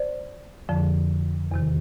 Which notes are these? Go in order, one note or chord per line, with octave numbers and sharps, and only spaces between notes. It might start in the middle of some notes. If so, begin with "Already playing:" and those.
Already playing: C5 D5
F2 D3 F3
E2 C3 D#3